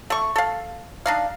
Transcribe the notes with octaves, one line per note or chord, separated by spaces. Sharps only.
A3 C#6
A4 F5
D4 D#4 F5